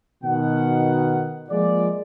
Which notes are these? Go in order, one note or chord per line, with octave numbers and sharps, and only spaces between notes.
B2 D#3 F#5
F3 G#3 A#3 F4 D5